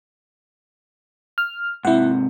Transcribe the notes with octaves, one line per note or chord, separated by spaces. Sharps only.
F6
G#2 C3 E4 F#5